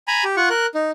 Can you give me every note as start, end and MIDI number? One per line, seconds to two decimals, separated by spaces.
0.08 0.24 80
0.08 0.24 82
0.08 0.24 83
0.24 0.36 67
0.37 0.49 65
0.37 0.49 78
0.37 0.49 85
0.50 0.66 70
0.50 0.66 90
0.75 0.91 63